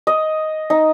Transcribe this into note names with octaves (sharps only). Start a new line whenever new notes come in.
D#5
D#4